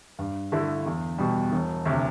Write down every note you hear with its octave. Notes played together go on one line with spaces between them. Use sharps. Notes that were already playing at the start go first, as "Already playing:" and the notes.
G2
D3 A3 E4
E2
B2 G3
E1
D2 C3